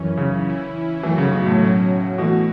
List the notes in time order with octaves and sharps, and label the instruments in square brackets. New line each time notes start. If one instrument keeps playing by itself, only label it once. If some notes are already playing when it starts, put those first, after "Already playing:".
Already playing: [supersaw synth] F#2 E3 C#4
[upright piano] C#3
[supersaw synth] E3 C#4 E4
[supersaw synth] F#2 F#3 A3 F#4 [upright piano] E3
[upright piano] C#3
B2
A2
[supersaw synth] B2 F#3 C#4 F#4
[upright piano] B2 [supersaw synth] E3 A3 F#4